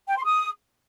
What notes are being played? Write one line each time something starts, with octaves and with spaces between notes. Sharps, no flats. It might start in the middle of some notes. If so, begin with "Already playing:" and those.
G5
C6
D#6